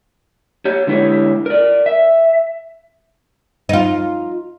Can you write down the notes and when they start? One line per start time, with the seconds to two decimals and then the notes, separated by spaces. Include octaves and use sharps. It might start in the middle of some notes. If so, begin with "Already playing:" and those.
0.65 G4 C#5
0.87 D3 G#3 E4 G4 C#5
1.46 A#4 D5
1.86 E5
3.69 D#4 F4